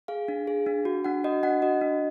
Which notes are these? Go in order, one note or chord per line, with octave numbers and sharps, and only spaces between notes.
G#4 F5
D4
G#4
D4
F#4
D4 F#5
F#4 D#5
D4 F#5
F#4 D#5
D4